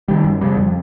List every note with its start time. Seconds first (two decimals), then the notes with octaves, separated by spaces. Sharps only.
0.08 D#3 G3
0.24 F#2
0.41 C#3 E3 G3
0.57 F2